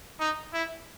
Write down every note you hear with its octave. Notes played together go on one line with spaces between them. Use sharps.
D#4
E4